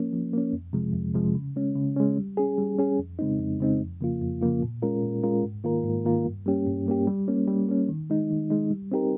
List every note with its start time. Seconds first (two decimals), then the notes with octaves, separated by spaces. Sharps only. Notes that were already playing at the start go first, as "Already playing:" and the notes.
Already playing: F3 A#3 C#4
0.13 F3
0.33 A#3 C#4
0.53 F2
0.73 C3 F3 G#3
0.94 F2
1.14 C3 F3 G#3
1.35 C#3
1.56 G#3 C#4
1.75 C#3
1.96 G#3 C#4
2.17 G3
2.37 C#4 G#4
2.58 G3
2.79 C#4 G#4
2.99 F2
3.19 C#3 G#3 C4 D#4
3.39 F2
3.60 C#3 G#3 C4 D#4
3.80 F2
4.01 C#3 F3 A#3 F4
4.21 F2
4.41 C#3 F3 A#3 F4
4.62 A#2
4.82 G#3 C#4 F4 A#4
5.03 A#2
5.23 G#3 C#4 F4 A#4
5.43 G#2
5.64 D#3 A#3 F4 A#4
5.84 G#2
6.05 D#3 A#3 F4 A#4
6.25 G2
6.46 G3 A#3 C#4 G4
6.67 G2
6.86 G3 A#3 C#4 G4
7.07 G3
7.28 A#3 C#4
7.48 G3
7.69 A#3 C#4
7.89 D#3
8.10 G#3 D#4
8.30 D#3
8.50 G#3 D#4
8.71 G3
8.92 C4 D#4 G4 A#4